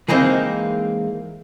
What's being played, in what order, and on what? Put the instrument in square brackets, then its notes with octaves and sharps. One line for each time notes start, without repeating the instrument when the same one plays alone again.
[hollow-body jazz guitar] E3 G#3 A#3 C4 D#4